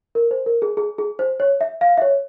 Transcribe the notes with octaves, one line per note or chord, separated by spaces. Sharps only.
A#4
C5
A#4
G#4
G#4
G#4
C5
C#5
E5
F5
E5
C#5